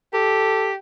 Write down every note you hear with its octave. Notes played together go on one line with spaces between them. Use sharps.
G4 A4